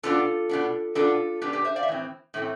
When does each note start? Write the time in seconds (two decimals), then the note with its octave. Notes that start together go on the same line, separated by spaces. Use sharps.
0.03 B2 B3 D4 F4 A4
0.49 B2 B3 D4
0.95 B2 B3 D4 F4 A4
1.41 B2 B3 D4 G4 B4
1.53 G4 B4
1.64 C5 E5
1.76 D5 F5
1.83 E5
1.88 A2 E3 C4
2.34 A2 E3 A3 C4